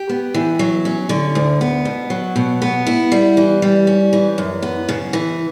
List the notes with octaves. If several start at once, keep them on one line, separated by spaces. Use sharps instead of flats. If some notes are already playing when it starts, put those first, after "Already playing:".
Already playing: G4
B3
E3
F#3
C#4
D3
D2
B3
B2
F#3
B2
B3
E4
G3
E3
G3
C#4
E3
F#2
B3
C#3
E3